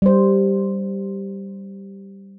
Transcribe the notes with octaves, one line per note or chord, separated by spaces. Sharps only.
G3 C5